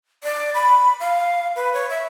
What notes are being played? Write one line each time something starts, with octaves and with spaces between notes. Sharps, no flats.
D5
B5
F5
B4
C#5
E5